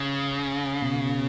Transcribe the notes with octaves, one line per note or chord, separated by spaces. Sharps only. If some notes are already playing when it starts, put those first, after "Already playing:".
Already playing: C#3
B2